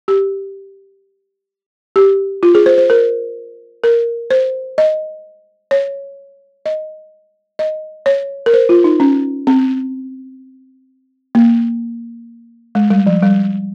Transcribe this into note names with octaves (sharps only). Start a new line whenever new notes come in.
G4
G4
F4
G#4
C5
C5
A#4
A#4
C5
D#5
C#5
D#5
D#5
C#5
A#4
C5
F4
D#4
C#4
C4
A#3
G#3
G3
F3
G3